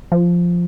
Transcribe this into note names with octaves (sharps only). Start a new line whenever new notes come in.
F3